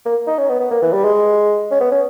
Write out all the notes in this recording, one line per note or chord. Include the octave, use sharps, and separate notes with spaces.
A#3
D#4
C#4
B3
B3
A#3
E3
G3
G#3
C#4
B3
C#4